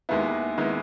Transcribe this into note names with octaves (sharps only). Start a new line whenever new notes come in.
D#2 D#3 G#3 B3 E4
D#3 G#3 B3 E4